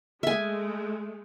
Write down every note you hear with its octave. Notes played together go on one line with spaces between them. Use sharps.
G#3 A3 E5 G#5